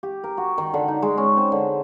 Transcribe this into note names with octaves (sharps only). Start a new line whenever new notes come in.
G4
A#4
F#4
D#3
D3
D#4
G#3
C#4
C4
D3